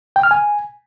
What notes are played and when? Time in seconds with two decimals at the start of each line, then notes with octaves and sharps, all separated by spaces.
0.16 G5
0.23 F6
0.31 G#5